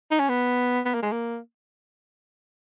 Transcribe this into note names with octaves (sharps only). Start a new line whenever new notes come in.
D#4
C#4
B3
B3
A#3
G#3
A#3